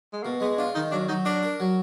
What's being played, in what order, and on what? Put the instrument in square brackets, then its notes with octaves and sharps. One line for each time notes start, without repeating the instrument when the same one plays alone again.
[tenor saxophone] G#3
[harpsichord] B2 [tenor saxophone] A#3
[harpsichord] G#3 [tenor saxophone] B3
[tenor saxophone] D4 [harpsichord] F4
[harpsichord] D#3 [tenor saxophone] D#4
[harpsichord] F#3 [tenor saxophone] D4
[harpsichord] F#3 [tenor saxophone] D#4
[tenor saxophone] D4 [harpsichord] A#4
[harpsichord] A#4
F#3